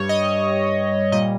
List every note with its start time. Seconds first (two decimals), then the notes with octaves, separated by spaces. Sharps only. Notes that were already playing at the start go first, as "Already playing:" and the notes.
Already playing: G2 G3 C#5
0.09 D#5
1.12 A#2 G3 D#5